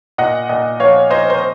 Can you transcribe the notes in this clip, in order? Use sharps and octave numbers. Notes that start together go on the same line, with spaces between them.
A#2 D#5 F#5
A#2 D#5 F#5
F3 C#5 F5
F3 C5 D#5
C5